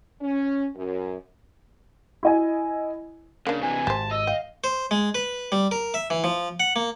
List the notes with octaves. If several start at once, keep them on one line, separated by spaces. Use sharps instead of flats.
C#4
F#2
E4 D#5 G#5
C#3 A#3 D4
C3 E3 G#5
G#1 G4 C5 A5
D#5 E6
F5 G5
C5
G#3
B4
G3
A#4
E5
E3
F3
F#5
A#3